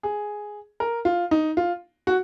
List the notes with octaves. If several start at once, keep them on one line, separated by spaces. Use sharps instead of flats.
G#4
A#4
F4
D#4
F4
F#4